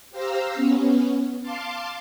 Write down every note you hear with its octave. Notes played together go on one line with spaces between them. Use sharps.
G4 C5 F5 A#5 E6
B3 C#4
F5 A5 C6 D6